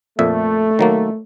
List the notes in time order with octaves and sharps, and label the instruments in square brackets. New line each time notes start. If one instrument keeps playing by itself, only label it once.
[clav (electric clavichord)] F2 A#2 E5 [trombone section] A3
[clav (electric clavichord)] D#3 F#3 A#3